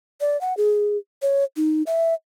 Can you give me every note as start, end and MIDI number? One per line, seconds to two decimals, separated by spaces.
0.21 0.39 74
0.41 0.56 78
0.57 0.98 68
1.22 1.44 73
1.57 1.83 63
1.87 2.14 76